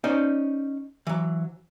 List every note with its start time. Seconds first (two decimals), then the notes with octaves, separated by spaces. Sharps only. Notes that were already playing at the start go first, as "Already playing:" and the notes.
0.04 C#4 D#4 C5 D5
1.07 E3 F#3